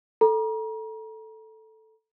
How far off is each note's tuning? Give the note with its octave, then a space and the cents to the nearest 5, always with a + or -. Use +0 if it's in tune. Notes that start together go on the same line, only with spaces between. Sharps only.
A4 +0 A#5 +35